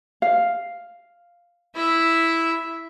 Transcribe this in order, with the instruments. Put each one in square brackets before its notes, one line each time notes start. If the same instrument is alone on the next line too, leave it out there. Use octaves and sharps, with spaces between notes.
[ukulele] F5
[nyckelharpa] E4 E5